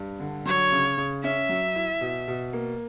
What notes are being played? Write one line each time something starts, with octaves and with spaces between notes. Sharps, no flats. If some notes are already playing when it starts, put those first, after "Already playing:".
Already playing: G2
D3
F#3 C#5
C#3
C#3
C#4 E5
F#3
E4
B2
B2
A#3